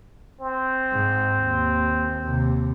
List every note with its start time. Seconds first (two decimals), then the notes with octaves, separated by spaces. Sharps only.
0.41 C4
0.92 G#2
1.37 D#2
2.25 D#2 C3